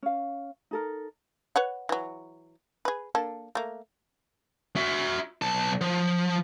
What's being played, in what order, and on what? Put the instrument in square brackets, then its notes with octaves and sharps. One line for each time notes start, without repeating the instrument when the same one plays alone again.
[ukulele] C#4 F5
D#4 A4 A#4
[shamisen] B4 C#5 F#5
E3 F#3
G#4 B4
A#3 D4 A4
A3 A#3
[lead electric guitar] F#4 E5
B1 A5
F3